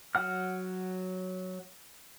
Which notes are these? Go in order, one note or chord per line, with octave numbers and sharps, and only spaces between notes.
F#3 F#5 F6